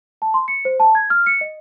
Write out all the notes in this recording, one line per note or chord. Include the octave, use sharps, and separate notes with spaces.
A5
C6
C#7
C5
A5
G#6
F6
C#7
D#5